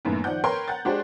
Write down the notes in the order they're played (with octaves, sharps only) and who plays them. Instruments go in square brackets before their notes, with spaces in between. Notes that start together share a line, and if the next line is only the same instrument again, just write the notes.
[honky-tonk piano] F#2 A2 D#3 A#3 B3
D#3 F3 D5 F#5 G6
A#4 B4 C#5 G5 C6
F#5 A#5 G6 A6
G#3 D4 F#4 G4 C5 D5